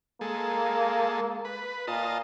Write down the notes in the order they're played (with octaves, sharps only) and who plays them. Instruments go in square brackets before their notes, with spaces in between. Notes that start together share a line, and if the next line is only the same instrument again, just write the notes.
[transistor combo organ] G#3 A4 [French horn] A#3
[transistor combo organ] B4
[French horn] A#2 [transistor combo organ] F4 D#5 A5